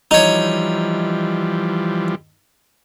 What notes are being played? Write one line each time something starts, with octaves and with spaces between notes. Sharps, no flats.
E3 F3 G3 D#4 C#5